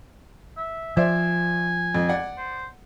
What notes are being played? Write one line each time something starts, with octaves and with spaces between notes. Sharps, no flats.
E5
F3 C5 D5 E5 G#5
F2
D5 F#5
C5